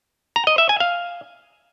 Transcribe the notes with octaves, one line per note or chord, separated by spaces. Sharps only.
A#5
D#5
E5
G#5
F5